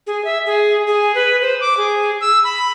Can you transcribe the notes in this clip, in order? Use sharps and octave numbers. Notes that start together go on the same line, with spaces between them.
G#4
E5
G#4
G#4
B4
C5
D6
G#4
E6
B5